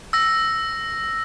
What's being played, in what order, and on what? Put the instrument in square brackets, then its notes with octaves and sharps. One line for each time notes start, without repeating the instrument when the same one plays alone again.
[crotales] E6 A#6